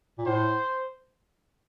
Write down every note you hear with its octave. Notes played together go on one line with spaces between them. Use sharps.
A#2
A2 C5